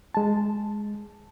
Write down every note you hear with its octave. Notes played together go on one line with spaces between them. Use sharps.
G#3 A5